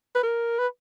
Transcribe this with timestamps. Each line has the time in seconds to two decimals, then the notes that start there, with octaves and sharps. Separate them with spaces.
0.15 B4
0.23 A#4
0.59 B4